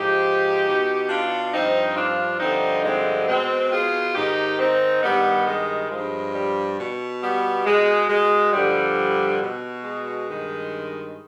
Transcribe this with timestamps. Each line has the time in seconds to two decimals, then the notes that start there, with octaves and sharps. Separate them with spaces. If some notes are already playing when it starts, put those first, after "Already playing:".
Already playing: G#2 F3 D#4 G4
0.65 B2
1.08 D4 F4
1.53 G2 F3 C4 D#4
1.96 D4 F4
2.40 G2 D3 F3 C4 D#4
2.84 G#3 C4
3.27 B2 G#3 C4
3.71 F4 G#4
4.15 G#2 D#3 D#4 G4
4.59 C4 D#4
5.03 G2 D#3 G3 B3
5.46 G#3
5.90 G2 F3 G#3
6.34 G3
6.78 B2
7.21 G3 B3
7.65 B2 G#3
8.09 G#3
8.52 G2 D3 F3 G3
9.40 B2
9.84 G#3
10.27 G2 D#3